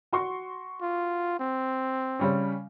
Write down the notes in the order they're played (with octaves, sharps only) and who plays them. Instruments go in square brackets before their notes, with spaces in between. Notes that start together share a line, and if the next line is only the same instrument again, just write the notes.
[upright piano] F#4 C6 C#6
[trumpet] F4
C4
[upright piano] C#3 G3 C#4